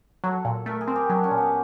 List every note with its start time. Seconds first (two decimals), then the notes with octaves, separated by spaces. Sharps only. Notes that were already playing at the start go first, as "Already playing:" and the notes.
0.24 F#3 A4
0.45 A#2
0.66 A3 A#4
0.81 G#4
0.88 C4
0.96 G4
1.10 F#3 D4
1.24 C#4
1.31 A#2
1.38 B3